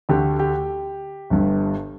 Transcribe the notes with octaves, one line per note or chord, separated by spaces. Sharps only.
D2 D3 A3 G4
G4
G1 G2 G3